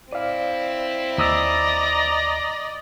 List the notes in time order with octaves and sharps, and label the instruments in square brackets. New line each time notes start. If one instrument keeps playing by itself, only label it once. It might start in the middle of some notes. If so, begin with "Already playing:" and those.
[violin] C4 E4 [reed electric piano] D5 F5
[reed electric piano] D#2 D#6 E6 [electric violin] D5 D#5 [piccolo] A#5